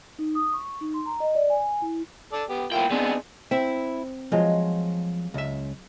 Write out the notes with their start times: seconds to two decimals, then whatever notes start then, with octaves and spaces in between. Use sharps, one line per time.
0.19 D#4
0.35 D#6
0.53 C#6
0.81 D#4
0.94 C6
1.06 A#5
1.20 D#5
1.35 D5
1.50 G#5
1.82 E4
2.32 A4 D5
2.49 B3 G4
2.72 A#3 B3 E4 F4 G5
2.91 B3 C4 D4 D#4 G#4
3.51 C4 E4 E5
4.32 F3 F#3 G#3 F4
5.34 C#2 E5